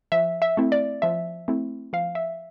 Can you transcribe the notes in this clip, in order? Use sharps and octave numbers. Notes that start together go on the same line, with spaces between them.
F3 E5
E5
A3 C4 E4
D5
F3 E5
A3 C4 E4
F3 F5
E5